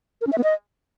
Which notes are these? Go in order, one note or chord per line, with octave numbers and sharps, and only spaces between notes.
A#4
C#4
E5
B3
D#5